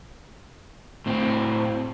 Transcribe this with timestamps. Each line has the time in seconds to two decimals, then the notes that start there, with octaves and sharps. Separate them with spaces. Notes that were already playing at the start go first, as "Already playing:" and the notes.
1.06 A2 C4